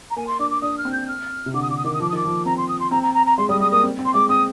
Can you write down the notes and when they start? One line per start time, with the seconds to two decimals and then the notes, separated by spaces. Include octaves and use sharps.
0.10 A#5
0.16 A#3 G#5
0.27 C6
0.39 D4 D6
0.50 D6
0.62 D4 D#6
0.78 F6
0.85 C4
0.92 G6
1.08 F6
1.46 C3
1.54 D3 D6
1.62 D#6
1.70 D3 D6
1.77 D#6
1.84 D#3 D6
1.94 D#6
2.00 F3 D6
2.09 D#6
2.13 D#3 D6
2.25 F3
2.45 C4 A#5
2.57 C6
2.68 D#6
2.80 C6
2.91 C4 A#5
3.03 A#5
3.14 A#5
3.26 A#5
3.38 G#3 C6
3.49 G3 D#6
3.60 G#3 D#6
3.71 A#3 D#6
3.83 C4
3.99 C4
4.05 C6
4.14 G#3 D6
4.29 C4 D#6